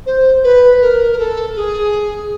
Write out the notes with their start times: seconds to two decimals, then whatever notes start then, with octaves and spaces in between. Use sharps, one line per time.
0.06 C5
0.43 B4
0.81 A#4
1.11 A#4
1.18 A4
1.56 G#4